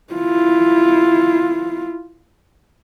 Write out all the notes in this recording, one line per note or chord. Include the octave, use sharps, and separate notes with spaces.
E4 F4